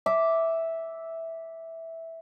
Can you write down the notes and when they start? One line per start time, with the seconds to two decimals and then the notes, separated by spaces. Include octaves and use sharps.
0.06 E5 D6